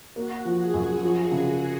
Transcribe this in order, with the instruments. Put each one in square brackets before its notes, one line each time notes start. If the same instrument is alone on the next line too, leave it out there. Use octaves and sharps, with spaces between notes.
[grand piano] A#3 [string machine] F#4
[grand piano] F3
[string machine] G#4
[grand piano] F#2
F3
C#3